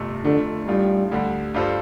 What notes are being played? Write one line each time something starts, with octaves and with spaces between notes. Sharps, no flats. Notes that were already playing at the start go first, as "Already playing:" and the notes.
Already playing: G1 F2 C3 A3
F1 F2 D3 F3 A3 D4
A1 A2 G3 A3 D4 F4
D2 D3 G3
G2 G3 F4 A4 C5